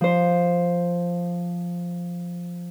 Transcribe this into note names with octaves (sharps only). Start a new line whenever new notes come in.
F3 C5